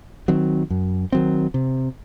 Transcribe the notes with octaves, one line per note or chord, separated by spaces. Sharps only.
D#3 F#3 C4
F#2
D#3 F#3 C4
C3